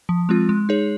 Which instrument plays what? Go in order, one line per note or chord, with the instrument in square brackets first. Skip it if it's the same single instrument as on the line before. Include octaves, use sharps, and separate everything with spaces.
[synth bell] F3
G#3 C4 F4
G#3
D#4 G#4 C#5